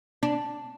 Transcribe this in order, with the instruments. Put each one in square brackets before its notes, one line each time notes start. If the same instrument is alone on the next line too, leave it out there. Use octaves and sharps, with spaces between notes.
[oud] D4